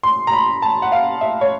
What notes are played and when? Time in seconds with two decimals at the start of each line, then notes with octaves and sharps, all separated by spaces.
0.03 C6
0.27 A#5
0.33 B5
0.62 A5
0.82 F#5
0.92 F5
1.21 E5
1.41 C#5